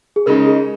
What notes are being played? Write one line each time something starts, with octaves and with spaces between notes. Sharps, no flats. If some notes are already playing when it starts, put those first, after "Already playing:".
G#4
C#3 G#3 D#4 A#4
G#4